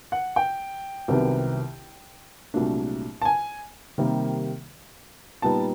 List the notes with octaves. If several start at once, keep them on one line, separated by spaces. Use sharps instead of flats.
F#5
G5
C2 C3 D#3 F#3 B3
C2 A#2 F#3 A3 D4
A5
G#5
C3 D#3 G3 A#3
A#2 G3 B3 D#4 A5